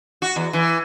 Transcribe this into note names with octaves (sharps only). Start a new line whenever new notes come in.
F#4
E2
E3